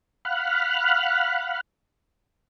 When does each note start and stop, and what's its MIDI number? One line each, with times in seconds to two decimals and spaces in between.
0.25 1.61 77
0.25 1.61 78
0.25 1.61 83
0.25 1.61 89
0.25 1.61 90